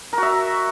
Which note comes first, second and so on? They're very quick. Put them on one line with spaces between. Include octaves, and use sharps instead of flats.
A#4 F#4 E5